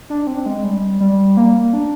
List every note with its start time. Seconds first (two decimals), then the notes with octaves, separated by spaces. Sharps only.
0.10 D4
0.27 C4
0.46 G#3
0.64 G3
1.00 G3
1.37 A#3
1.73 D4